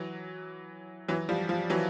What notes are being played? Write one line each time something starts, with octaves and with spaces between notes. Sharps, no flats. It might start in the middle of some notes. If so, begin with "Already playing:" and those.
Already playing: E3 F#3
E3 F#3
F3 G3
F3
E3 F#3